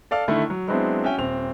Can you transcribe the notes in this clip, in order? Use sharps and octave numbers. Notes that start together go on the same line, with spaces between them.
A4 D5 F5 F6
D3 D#3 A3 E4
F#3
F#3 G#3 B3 C4 D4 E4
C#4 F#4 E5 G5 G#5
D#1 C4 F7